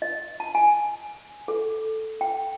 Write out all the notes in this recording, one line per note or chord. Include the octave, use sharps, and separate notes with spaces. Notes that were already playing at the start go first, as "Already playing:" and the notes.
D#5
A5
G#5
A4
G5